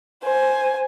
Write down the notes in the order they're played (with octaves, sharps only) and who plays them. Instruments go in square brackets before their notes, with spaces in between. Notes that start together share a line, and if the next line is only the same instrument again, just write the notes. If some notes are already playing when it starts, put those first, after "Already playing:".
[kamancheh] C5 G#5